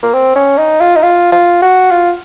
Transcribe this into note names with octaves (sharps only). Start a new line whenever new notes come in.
A#3
C4
C#4
D#4
F4
D#4
F4
F4
F#4
F4